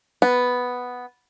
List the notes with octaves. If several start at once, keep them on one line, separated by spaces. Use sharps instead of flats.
B3